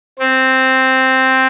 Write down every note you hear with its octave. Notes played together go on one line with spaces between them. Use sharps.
C4